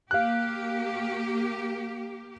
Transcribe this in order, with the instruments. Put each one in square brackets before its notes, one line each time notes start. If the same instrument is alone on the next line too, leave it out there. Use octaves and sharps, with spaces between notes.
[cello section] A#3 G4 [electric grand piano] F5 F#6